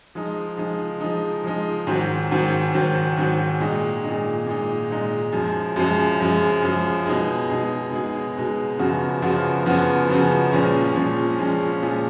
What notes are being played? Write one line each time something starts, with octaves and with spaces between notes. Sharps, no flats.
F3 G#3 D#4
F3 G#3 D#4
F3 G#3 D#4
F3 G#3 D#4
G#2 D#3 F#3
G#2 D#3 F#3
G#2 D#3 F#3
G#2 D#3 F#3
A#2 G#3 D#4
A#2 G#3 D#4
A#2 G#3 D#4
A#2 G#3 D#4
F#2 F3 G#3
F#2 F3 G#3
F#2 F3 G#3
F#2 F3 G#3
B2 G#3 D#4 G#4
B2 G#3 D#4 G#4
B2 G#3 D#4 G#4
B2 G#3 D#4 G#4
F#2 C#3 F3 B3 F#4
F#2 C#3 F3 B3 F#4
F#2 C#3 F3 B3 F#4
F#2 C#3 F3 B3 F#4
A#2 F3 G#3 C#4
A#2 F3 G#3 C#4
A#2 F3 G#3 C#4
A#2 F3 G#3 C#4